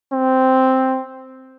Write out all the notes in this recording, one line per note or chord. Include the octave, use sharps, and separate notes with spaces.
C4